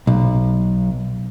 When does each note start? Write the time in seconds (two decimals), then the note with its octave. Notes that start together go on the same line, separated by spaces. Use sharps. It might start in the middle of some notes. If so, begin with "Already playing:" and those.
0.07 B1